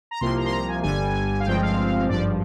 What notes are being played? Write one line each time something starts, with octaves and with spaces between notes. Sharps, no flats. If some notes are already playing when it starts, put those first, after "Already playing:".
A#5
C2 C3 F3 A#3 C6
A#5
C6
A#5
G#5
G1 G2 D3 G3 G#5
F5
G1 G2 F3 G#3 C4 G5
F5
G#1 G2 F3 D5